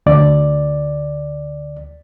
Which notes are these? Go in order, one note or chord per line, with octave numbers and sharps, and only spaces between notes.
D2 D5